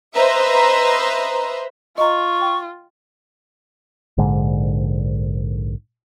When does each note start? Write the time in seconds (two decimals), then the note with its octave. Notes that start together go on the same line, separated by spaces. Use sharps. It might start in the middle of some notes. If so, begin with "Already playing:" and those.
0.15 B4 C5 D#5 E5 A#5
1.98 F4 D#5 A#5 C#6
2.42 G5
4.18 A#1 G#2 D3 G#3